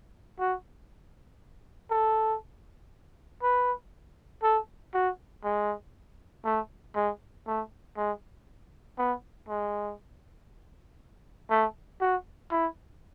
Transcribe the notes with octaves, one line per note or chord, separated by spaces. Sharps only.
F#4
A4
B4
A4
F#4
G#3
A3
G#3
A3
G#3
B3
G#3
A3
F#4
E4